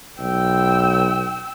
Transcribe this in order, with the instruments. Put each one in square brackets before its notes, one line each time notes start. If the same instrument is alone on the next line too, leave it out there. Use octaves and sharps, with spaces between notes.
[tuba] B1 [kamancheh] G5 E6